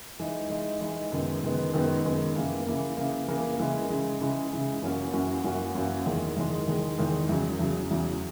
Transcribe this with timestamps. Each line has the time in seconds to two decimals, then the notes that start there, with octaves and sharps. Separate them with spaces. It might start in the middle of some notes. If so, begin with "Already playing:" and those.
0.20 E3 G#3 D#4
0.50 E3 G#3 D#4
0.81 E3 G#3 D#4
1.12 F#2 D#3 G#3 B3
1.43 F#2 D#3 G#3 B3
1.73 F#2 D#3 G#3 B3
2.05 F#2 D#3 G#3 B3
2.35 C#3 E3 A#3
2.67 C#3 E3 A#3
2.97 C#3 E3 A#3
3.28 C#3 E3 A#3
3.58 C#3 E3 G#3
3.89 C#3 E3 G#3
4.21 C#3 E3 G#3
4.51 C#3 E3 G#3
4.82 F#2 E3 A#3 C#4 F#4
5.13 F#2 E3 A#3 C#4 F#4
5.44 F#2 E3 A#3 C#4 F#4
5.75 F#2 E3 A#3 C#4 F#4
6.06 E2 D#3 G#3
6.37 E2 D#3 G#3
6.67 E2 D#3 G#3
6.98 E2 D#3 G#3
7.29 E2 C#3 F#3
7.59 E2 C#3 F#3
7.91 E2 C#3 F#3